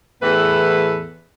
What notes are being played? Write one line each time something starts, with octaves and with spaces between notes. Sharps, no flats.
E2 A2 E3 A4 B4